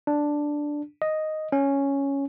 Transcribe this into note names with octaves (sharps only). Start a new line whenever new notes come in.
D4
D#5
C#4